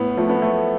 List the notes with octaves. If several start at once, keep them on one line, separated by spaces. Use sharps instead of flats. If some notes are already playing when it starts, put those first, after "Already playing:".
Already playing: A2 B3
F3 A3
B3
A3